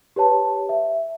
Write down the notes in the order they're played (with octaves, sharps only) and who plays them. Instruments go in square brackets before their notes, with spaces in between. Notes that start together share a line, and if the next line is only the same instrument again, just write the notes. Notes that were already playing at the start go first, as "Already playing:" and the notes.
[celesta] G4 B4 C#5 A5
E5